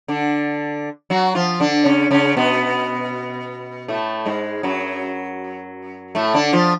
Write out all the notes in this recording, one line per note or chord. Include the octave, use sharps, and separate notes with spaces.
D3 D4
F#3 F#4
F3 F4
D3 D4
C#3 C#4
C#3 C#4
B2 B3
A2 A3
G#2 G#3
F#2 F#3
A2 A3
D3 D4
F3 F4